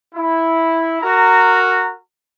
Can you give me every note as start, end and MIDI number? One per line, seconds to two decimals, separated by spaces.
0.14 1.01 64
1.02 1.93 66
1.02 1.93 70
1.02 1.93 82